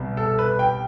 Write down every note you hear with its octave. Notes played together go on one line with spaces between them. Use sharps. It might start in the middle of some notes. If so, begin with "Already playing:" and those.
Already playing: C2 B2 G3
A4
B4
G5